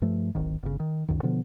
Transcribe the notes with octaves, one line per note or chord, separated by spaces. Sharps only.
G2 F3 A3
D1 G#1 D#3
G1 C#3
D#3
C#2 F#2 D#3
B2 D3 F3 B3